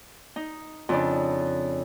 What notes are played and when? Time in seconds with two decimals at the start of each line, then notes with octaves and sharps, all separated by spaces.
0.36 D#4
0.89 F2 C#3 D4